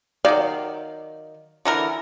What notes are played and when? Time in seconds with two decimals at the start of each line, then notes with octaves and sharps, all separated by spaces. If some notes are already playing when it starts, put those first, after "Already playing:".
0.25 D#3 F#3 D5 F5
1.65 D3 E3 A#4